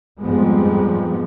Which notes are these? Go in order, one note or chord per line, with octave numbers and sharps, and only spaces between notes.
F2 G#2 F3 G3 G#3 B3